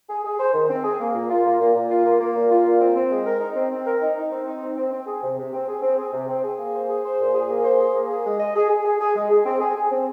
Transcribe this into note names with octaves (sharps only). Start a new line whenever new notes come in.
G#4
G#4
C5
D#3
C4
G#4
A#3
A#2
F4
A#3
A#2
A#2
F4
A#3
A#3
A#2
F4
A#2
C4
C4
G#3
A#4
D#4
C4
C4
A#4
D#4
D#4
C4
D#4
C4
C4
C4
G#4
C3
C3
C4
G#4
C4
G#4
C3
C4
G#4
A#3
C5
G#4
C5
A#2
G#4
A#3
C5
G#4
A#3
G#4
G#3
D#5
G#4
G#4
G#4
G#4
G#3
G#4
C4
G#4
G#4
C4